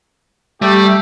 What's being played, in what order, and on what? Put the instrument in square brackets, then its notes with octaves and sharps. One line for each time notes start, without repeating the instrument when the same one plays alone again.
[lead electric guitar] G3 [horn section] A3 G4